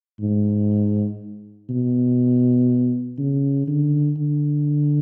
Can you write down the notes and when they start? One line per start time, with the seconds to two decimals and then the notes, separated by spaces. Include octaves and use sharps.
0.20 G#2
1.70 B2
3.18 C#3
3.68 D3
4.17 D3